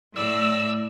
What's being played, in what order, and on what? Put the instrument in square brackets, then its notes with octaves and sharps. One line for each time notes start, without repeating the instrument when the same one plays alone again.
[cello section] A2 [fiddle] D5 [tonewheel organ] E6